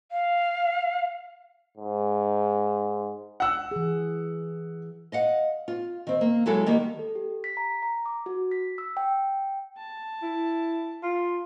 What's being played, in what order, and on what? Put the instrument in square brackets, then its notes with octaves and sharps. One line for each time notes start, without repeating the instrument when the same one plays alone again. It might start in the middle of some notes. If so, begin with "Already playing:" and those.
[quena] F5
[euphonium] G#2
[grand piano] F#5 E6
[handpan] E3 G#4
[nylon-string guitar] D#5 F5 F#5
F4
D#3 C4
A#3
F#3 G#3 E4 G#4 A4
D#3 G3 A#3
[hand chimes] A4
G4
B6
A#5
A#5
D6
F#4
B6
E6
G5
[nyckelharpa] A5
[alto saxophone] E4
F4